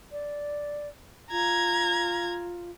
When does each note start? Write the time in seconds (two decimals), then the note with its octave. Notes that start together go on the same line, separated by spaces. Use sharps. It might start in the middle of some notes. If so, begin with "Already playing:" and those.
0.12 D5
1.31 F4 A#5 G#6